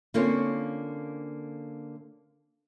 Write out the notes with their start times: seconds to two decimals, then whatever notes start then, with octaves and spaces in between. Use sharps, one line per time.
0.14 D3 A#3 C4 C#4 F4 C#5